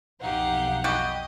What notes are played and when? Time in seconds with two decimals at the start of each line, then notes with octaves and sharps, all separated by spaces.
0.22 B1 F2 B2 D#4 G4 F5 F#5
0.84 G3 F#4 G4 D#5